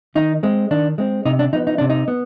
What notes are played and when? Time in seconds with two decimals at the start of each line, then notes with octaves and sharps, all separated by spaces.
0.15 D#3 D#4
0.43 G#3 C4
0.71 D#3 D4
0.98 G#3 C4
1.25 C3 D#4
1.39 D4
1.53 F3 B3 D#4
1.67 D#4
1.78 C3 D4
1.90 D#4
2.08 B3